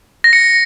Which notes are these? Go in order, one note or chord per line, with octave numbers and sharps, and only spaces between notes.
A#6
C#7